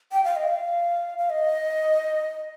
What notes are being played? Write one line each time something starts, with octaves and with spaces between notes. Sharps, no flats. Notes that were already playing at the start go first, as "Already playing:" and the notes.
G5
F5
D#5
F5
F5
D#5